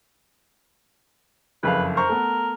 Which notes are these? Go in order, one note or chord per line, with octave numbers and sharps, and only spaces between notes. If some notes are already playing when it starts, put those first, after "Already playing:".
F#1 F2 B4 F5
A#4 C5 C#6
A3 B3